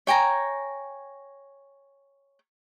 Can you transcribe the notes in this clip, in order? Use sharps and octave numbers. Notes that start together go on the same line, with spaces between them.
C#5 G5 G#5 A#5